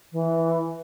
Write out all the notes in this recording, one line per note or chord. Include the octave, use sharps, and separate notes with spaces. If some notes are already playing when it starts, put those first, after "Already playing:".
E3